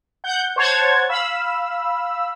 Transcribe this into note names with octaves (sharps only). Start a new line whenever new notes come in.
F#5 G6
C5 C#5 F#5 A5 G#6
F5 B5 E6